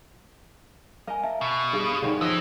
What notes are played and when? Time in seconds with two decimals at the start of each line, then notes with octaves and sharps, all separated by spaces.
1.07 A#4 D#5 F5 G#5
1.24 E5 A5
1.41 B2
1.73 G2 G#4 F5
2.02 D3 D#3 C#4
2.21 E3 F3 D#5 D#6 A#6